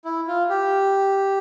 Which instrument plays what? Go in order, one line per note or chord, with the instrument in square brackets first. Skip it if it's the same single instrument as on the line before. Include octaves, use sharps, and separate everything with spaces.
[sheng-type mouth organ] E4
F4
G4